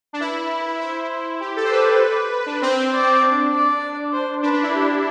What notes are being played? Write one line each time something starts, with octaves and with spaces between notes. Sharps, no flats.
D4
E4 B4
E4 C5
G4
A4
C5
B4 D5
B4
D4
C4 C5
D5
D4
D5
C5
D4 B4
D4
E4
G4